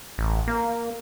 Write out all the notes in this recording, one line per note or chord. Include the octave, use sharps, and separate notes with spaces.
A1
A#3